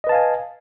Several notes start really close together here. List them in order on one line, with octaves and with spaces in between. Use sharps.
D#5 B4 A5 F5 G#5